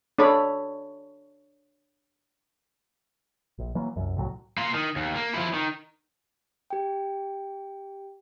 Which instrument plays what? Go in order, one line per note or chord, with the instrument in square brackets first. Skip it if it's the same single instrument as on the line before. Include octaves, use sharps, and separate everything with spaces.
[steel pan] D4 A4 C#5 B5
[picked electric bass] A#1
E3 F#3 A#3
C2 F#2
C2 A2 F3 F#3
[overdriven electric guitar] A#3 F4
D#3
D#2
A#3
F3 E4
D#3
[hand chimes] G4 G5